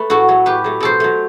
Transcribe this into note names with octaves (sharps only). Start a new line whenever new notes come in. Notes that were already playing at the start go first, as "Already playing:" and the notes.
Already playing: A3 B4
A2 F#4 A4
F#3 A3
A2 G4 B4
F#3 A3
B2 A4 C5
F#3 A3